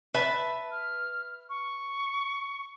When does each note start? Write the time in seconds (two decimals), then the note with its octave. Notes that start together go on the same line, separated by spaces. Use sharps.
0.14 B4 E5 A5
0.71 F6
1.49 C#6